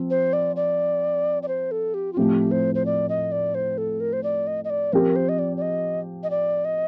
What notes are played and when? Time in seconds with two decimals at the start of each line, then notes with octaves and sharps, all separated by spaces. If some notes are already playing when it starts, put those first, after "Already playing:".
Already playing: F3 C4
0.10 C5
0.33 D5
0.56 D5
1.43 D5
1.48 C5
1.71 A4
1.94 G4
2.13 F4
2.17 A2 F3 A3 C4 G4
2.51 C5
2.75 C5
2.86 D5
3.09 D#5
3.32 D5
3.55 C5
3.78 A4
4.00 A#4
4.13 C5
4.23 D5
4.47 D#5
4.65 D#5
4.70 D5
4.93 F3 C4 G4 A#4
5.16 C5
5.29 D#5
5.39 D5
5.57 D5
5.62 D#5
6.23 D#5
6.31 D5
6.65 D#5